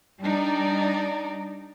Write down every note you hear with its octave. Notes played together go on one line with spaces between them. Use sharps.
G3 D4 D#4 D5